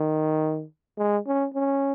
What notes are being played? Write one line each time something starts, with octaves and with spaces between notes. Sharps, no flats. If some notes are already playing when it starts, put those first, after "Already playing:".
Already playing: D#3
G#3
C#4
C#4